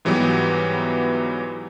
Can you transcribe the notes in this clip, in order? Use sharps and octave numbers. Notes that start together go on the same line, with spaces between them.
G#2 E3 F#3 G3 B3 G4